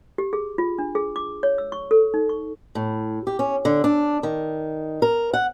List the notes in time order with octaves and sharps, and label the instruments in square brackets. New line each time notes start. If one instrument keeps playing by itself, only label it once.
[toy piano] G4
G#4
F4
D4
G#4
D6
C#5
E6
C#6
A4
D#4
C#6
[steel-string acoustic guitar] A2
G4
C#4
D3
D4
D#3
A#4
F#5